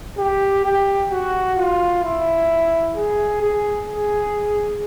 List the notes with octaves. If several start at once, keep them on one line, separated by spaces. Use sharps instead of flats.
G4
G4
F#4
F4
E4
G#4
G#4
G#4